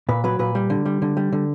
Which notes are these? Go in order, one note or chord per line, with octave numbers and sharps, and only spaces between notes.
A#2 B4
F#3 B4
A#2 B4
G3
D3
G3
D3
G3
D3